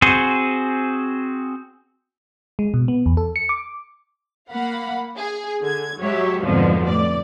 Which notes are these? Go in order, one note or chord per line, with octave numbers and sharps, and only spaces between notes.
C4 F#4 G#4 C5
G#3
B2
B3
E2
A4
C#7
D6
A#3 F5 F#5 B5
G#4
D3 G#6
F#3 G#3 G4 C#5 E5
F2 G#2 B2 D3 F3
A2 D5